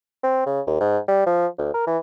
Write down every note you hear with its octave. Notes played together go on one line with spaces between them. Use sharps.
C4
C#3
D#2
G#2
G3
F3
D2
A#4
E3